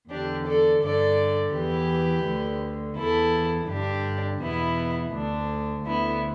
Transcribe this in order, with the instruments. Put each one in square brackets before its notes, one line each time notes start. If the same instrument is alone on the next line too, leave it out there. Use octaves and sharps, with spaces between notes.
[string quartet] E2 D3 D4 G4
A4 D5
G2 D3 A4 D5
E2 E3 G4 B4
D2 D3
E2 E3 E4 A4
G2 D3 D4 G4
E2 B2 B3 E4
D2 D3 D4
D2 D3 B3 E4